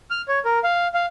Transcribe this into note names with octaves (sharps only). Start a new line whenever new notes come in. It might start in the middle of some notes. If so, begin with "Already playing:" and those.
F6
C#5
A#4
F5
F5